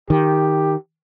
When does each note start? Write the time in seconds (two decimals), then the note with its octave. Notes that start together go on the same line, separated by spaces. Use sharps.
0.10 D#3 G4